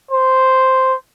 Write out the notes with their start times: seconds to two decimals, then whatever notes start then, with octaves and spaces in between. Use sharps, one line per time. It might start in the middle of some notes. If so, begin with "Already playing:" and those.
0.11 C5